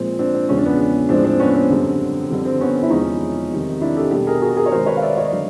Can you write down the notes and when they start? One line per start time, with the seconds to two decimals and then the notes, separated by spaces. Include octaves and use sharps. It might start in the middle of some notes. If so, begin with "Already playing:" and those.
Already playing: A#2 F3 G#3 C4
0.19 C4 D4
0.34 C4
0.49 E2 C#3 F3 G#3 C#4
0.58 D4
0.65 B3 C#4
1.09 A2 F3 G#3 C4 D4
1.24 C4 D4
1.39 B3 C#4
1.54 C4
1.70 F#2 D3 G3
2.30 F2 D3 G3
2.45 C4
2.61 B3 C#4
2.83 E4
2.90 E2 C3 F3 G#3 C#4 D#4
3.51 F2 C3 D#3 G3
3.81 D4 E4
3.96 G4 A4
4.11 B2 G3 G4 A4
4.27 G#4 A#4
4.41 F#4 G#4
4.56 G#4 A#4
4.66 C#5
4.71 C3 D#3 G#3 A#4 C5
4.86 B4 C#5
4.97 F5
5.02 D5 E5
5.17 C#5 D#5
5.32 D3 F#3 A3